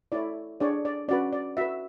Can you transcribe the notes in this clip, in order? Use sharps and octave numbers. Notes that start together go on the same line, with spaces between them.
E4 A4 C#5 D5
D4 G#4 C#5 D5
D5
C#4 F#4 B4 D5
D5
F#4 B4 E5